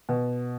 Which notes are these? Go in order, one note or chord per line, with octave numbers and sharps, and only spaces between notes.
B2